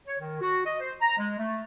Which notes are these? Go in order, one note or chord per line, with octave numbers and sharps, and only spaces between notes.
C#5
D#3
F#4
D#5
C5
A#5
G#3
A3